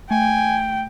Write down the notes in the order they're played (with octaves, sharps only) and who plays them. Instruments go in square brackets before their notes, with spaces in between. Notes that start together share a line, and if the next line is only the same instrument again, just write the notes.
[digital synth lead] A3 [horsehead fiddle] G5 [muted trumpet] G#5